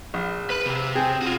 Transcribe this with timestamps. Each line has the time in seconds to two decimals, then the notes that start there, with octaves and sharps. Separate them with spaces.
0.14 A#1
0.50 B4 B5
0.66 C3
0.95 C4 G#4
1.22 F4 F#4